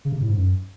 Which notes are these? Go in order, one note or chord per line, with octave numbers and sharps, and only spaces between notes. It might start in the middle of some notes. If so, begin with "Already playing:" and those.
C#3
C3
A2
G#2
F#2